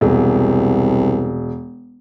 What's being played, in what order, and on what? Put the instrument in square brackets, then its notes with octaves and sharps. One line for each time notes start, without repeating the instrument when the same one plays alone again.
[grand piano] E1 [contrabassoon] C2